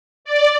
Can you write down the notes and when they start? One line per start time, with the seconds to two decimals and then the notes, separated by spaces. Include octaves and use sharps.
0.25 D5